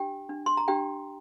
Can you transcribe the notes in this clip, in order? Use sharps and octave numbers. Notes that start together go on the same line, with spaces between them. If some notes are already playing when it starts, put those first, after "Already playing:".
Already playing: D4 G4 G5
D4
C6
A#5
D4 G4 G5